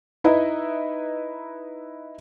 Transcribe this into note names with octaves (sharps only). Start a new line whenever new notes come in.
D#4 E4 B4 D#5 E5